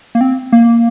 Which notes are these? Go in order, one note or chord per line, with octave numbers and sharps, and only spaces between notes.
A#3
C4
A#3